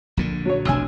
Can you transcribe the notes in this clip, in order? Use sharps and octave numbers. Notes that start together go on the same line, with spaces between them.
A#1 A#2 D3
F#3 C#5
A1 B2 D4 G#5 E6